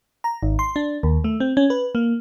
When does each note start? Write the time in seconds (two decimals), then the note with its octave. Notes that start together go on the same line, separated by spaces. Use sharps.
0.24 A#5
0.43 G#1
0.59 C6
0.76 D4
1.03 D#2
1.24 A3
1.40 C4
1.57 C#4
1.70 B4
1.95 A#3